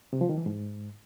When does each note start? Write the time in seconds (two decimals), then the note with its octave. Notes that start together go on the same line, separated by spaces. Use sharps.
0.13 C3
0.21 F3
0.29 D#3
0.38 E3
0.46 G#2